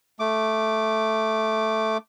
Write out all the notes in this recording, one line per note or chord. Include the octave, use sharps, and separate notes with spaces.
A3 D6